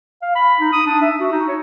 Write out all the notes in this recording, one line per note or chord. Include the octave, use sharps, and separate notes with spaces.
F5
B5
D#4
D#6
D4
E5
F#4
D#4
C#5